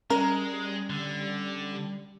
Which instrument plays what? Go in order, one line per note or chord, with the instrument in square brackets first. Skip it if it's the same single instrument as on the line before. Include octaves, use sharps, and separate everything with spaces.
[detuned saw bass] G3 [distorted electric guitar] G#3 [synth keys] C#4 [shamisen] A#4
[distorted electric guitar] D3